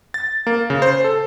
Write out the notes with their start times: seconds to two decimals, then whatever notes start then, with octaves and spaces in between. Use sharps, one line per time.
0.14 A6
0.47 A#3
0.70 C#3
0.82 C5
1.04 A4